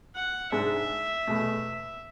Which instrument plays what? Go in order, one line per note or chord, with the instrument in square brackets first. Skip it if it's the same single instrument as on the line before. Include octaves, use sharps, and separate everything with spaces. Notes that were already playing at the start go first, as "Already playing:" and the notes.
[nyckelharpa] F#5
[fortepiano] G#2 G#3 D4 [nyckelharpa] E5
[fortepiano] E2 B2 A3